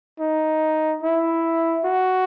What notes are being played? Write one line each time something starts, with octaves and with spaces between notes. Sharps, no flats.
D#4
E4
F#4